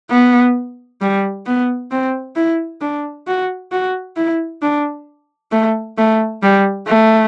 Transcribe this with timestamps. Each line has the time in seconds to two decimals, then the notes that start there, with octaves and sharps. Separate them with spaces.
0.10 B3
1.01 G3
1.46 B3
1.91 C4
2.36 E4
2.81 D4
3.27 F#4
3.72 F#4
4.16 E4
4.62 D4
5.52 A3
5.98 A3
6.43 G3
6.87 A3